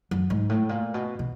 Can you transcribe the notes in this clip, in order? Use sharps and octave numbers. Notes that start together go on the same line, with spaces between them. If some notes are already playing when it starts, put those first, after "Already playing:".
F#2
G#2
A2
A#2
B2
B2